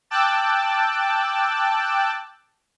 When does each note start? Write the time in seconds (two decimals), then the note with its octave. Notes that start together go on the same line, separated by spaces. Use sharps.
0.10 G5 A5 D6 E6 F#6 A6